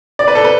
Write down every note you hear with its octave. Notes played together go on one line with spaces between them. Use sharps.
D5
B4
A4
B4